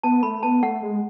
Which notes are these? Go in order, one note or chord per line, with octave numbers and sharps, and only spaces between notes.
B3 A5
A3 B5
B3 A5
A3 F#5
G#3